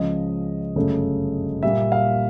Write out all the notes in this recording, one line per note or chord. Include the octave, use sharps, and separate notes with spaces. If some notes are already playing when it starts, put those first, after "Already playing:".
Already playing: C#2 C#3 F3 D#5
G1 F#2 C#3 F#3 A3
A#2 G3 A#3 E5
F5